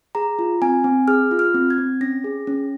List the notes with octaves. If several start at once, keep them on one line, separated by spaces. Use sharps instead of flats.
G#4 A#5
F4
C4 G#5
C4
G#4 F6
F4
F6
C4
G#6
C4
C#4 A#6
G#4
C#4